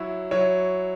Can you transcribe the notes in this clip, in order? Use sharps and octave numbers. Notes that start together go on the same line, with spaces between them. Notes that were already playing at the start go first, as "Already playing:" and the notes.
Already playing: F#3 E4 C#5
F#3 E4 C#5